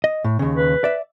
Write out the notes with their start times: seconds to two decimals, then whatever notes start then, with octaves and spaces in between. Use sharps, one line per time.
0.04 D#5
0.24 A2
0.39 D#2 C#3
0.57 B4
0.84 D5 E5